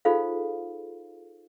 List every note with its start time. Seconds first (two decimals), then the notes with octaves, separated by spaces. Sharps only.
0.05 D#4 F4 G#4 A4 C5 F5